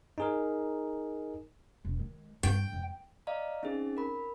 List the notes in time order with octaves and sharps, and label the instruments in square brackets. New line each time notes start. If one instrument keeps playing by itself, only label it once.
[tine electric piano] D#4 G#4 A#4
[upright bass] E1
D#3 G#3
[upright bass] G2 [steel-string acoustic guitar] G5
[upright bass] F2 G#3
[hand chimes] D5 D#5 F5 A#5
C4 C#4 D#4 G#4
A#4 B5